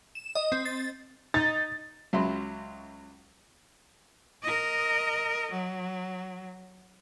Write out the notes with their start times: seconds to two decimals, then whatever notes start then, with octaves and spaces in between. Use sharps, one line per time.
0.15 E7
0.35 D#5
0.52 C4
0.65 A6
1.34 D#4 A6
2.13 C#2 F#3 E5 B5 C6
4.43 A#4 D#5
5.51 F#3